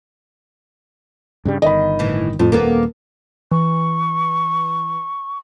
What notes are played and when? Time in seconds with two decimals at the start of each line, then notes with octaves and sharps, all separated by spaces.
1.45 G2 C#3 G3
1.62 G1 D#3 D#5 B5
1.99 A2 E3
2.39 F2 A2
2.52 D#1 A#3 B3 A4 A#4
3.52 E3 C#6